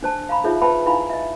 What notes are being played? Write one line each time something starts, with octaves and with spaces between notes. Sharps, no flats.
D4 C5 A5
F5 A#5 B5
D#4 F4 G#4 C5 C#5 E5
B4 C5 E5 G5 A5 B5
D#4 E4 F5 G#5 B5
D#5 E5